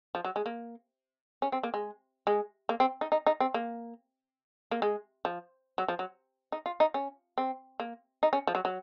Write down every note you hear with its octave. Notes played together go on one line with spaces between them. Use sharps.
F3
F#3
G#3
A#3
C#4
C4
A#3
G#3
G#3
A#3
C4
D#4
D#4
D#4
C4
A#3
A#3
G#3
F3
F#3
F3
F#3
D#4
F4
D#4
C#4
C4
A#3
D#4
C#4
F3
F#3
F#3